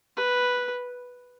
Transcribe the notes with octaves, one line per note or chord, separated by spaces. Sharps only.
B4